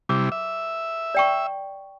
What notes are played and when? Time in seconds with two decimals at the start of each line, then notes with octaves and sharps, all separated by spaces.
0.09 C3 G3 E4 D6
0.32 E5
1.15 D5 G5 C#6